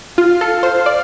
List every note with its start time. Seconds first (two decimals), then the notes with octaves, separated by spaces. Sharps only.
0.18 F4 F5
0.41 A4
0.63 C5
0.86 D5